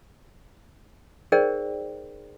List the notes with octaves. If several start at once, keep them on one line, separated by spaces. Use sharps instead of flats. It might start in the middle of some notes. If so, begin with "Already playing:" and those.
D#4 G#4 A#4 C5 D5 G5